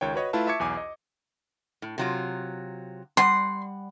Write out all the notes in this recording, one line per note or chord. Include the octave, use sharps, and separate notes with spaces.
C#2 D#3 C#5 G5
F#4 B4 C#5 D#5
A3 E4 F4 B4 A5
E5 A5 C#6 D6 G#6 C#7
B1 E2 G#5 D6
D#5
A2
C3 F#3 F4
G3 F#5 C6